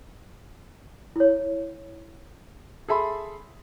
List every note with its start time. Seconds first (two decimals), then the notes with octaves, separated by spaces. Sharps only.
1.16 E4 C#5
2.89 G#4 A4 E5 B5 C6